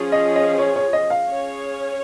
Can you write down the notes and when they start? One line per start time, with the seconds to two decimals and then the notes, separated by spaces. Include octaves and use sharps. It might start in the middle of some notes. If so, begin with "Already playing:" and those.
Already playing: F3 C#4 G#4
0.12 D#5
0.36 D#5
0.59 C#5
0.76 C#5
0.93 D#5
1.10 F5
1.28 C#4 G#4 C#5